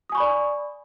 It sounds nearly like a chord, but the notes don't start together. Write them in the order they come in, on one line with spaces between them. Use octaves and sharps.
D#6 G#5 C#6 B5 D5